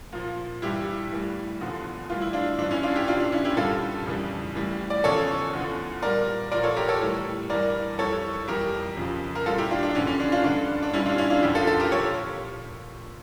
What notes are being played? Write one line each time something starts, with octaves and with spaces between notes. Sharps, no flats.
A#2 F3
G2 E3 G3 E4 G4
A2 E3 G3
E2 D3 F3
A2 E3 G3 F4
E4
D4 F4
G2 F3 D4
C#4 E4
D4 F4
E4 G4
A#2 F3 D4 F4
D4
C#4 E4
E4 G4
G2 D3 G3 F4 A4
F2 C#3 E3 G3
A2 E3 G3
D5
E2 C#3 F3 A4 C#5
E2 D3 F3
A#2 G3 A#4 D5
A#2 F3 A#4 D5
A4 C#5
G4 A#4
A4 C#5
A2 E3 G3
G2 E3 G3 A#4 D5
F2 E3 G3 A4 C#5
F2 E3 G3 G4 A#4
F2 C#3 F3
A#4
A#2 G3 F4 A4
E4 G4
D4 F4
D4
G2 D3 F3 C#4
C#4
D4
D4 F4
G2 D3 F3 D4
D4
A#2 G3 C#4 E4
D4 F4
C#4 E4
D4 F4
F2 D3 F3 E4 G4
F4 A4
F4 A4
G4 A#4
A#2 F3 A4 C#5